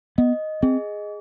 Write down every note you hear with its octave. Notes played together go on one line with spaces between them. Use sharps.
B3 D#5
C4 G#4